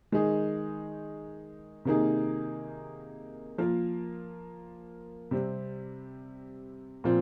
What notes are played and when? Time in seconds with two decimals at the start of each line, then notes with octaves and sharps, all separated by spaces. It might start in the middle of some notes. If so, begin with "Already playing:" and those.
0.12 D#3 G#3 D#4 G#4
1.85 C3 D#3 A#3 D#4 G#4
3.58 F3 A#3 F4 A#4
5.31 C3 G3 C4
7.04 A#2 F3 C4 F4